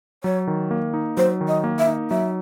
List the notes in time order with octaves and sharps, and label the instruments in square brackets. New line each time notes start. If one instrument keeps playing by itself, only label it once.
[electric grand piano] F#3 [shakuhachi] C#5
[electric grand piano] D#3
A#3
D#4
[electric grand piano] F#3 [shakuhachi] C5
[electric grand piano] D#3
[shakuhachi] D#5
[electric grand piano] A#3
[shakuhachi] E5
[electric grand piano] D#4
[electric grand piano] F#3 [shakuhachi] E5